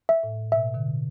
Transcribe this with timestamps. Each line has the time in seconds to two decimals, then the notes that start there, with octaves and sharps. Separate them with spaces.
0.09 E5
0.23 A2
0.52 B2 E5
0.75 B2 D3